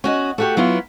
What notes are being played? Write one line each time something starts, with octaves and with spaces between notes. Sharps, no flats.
C#4 F#4 D#5
A3 F#4 G4
F#3 B3 E4 F4